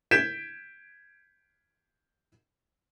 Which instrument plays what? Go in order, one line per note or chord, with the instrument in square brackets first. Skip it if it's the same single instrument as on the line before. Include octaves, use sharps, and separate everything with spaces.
[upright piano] G6 G#6 B6 D7 E7